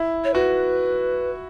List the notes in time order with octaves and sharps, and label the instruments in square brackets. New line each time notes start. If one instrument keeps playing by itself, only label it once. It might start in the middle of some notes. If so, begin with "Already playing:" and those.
Already playing: [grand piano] E4
[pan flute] C#5
[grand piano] F#4 [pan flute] B4